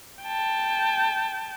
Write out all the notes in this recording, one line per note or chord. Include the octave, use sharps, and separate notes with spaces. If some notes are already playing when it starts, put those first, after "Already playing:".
G5 A5